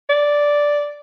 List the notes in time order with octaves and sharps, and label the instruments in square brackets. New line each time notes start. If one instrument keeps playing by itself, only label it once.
[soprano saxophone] D5